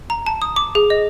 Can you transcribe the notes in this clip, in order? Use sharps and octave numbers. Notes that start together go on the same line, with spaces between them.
A#5
A5
D#6
D6
G#4
D#5